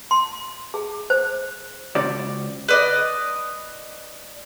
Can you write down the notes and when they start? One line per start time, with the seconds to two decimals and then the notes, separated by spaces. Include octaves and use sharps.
0.11 C6
0.74 G#4
1.10 C5
1.95 C#2 C#4 F#4 C5 D5
2.68 B4 D5 D#5